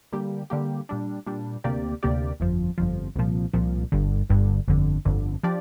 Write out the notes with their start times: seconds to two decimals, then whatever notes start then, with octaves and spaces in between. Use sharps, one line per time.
0.13 D3 G3 A#3 G4
0.50 D3 G3 A#3 G4
0.89 A#2 G3 D4
1.26 A#2 G3 D4
1.64 D2 C3 A#3 G4 D5
2.03 D2 C3 A#3 G4 D5
2.40 G1 F2 F3
2.78 G1 F2 F3
3.16 C2 A#2 F3
3.54 C2 A#2 F3
3.92 G1 G2 D3
4.30 G1 G2 D3
4.68 G1 F2 D3
5.05 G1 F2 D3
5.43 F3 D4 G4 D5